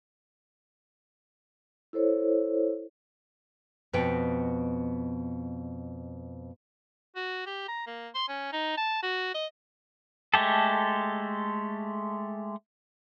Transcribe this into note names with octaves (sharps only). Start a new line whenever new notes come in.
E4 A4 C5 C#5
F2 B2 B3 G5
F#4
G4
A#5
A#3
C6
C#4
D#4
A5
F#4
D#5
G#3 A3 G4 A4